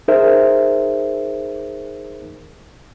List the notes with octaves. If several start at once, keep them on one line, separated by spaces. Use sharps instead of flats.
D#4 G#4 A#4 C5 E5